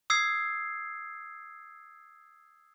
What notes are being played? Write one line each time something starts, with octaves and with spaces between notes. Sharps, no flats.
D#6 E6 G#6 C7